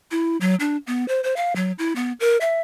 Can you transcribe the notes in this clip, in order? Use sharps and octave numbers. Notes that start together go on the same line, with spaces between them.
E4
F#3
D4
B3
C5
C5
F5
F#3
E4
B3
A#4
E5